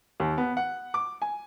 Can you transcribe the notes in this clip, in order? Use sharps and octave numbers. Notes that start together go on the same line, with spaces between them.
D#2
B3
F#5
D6
G#5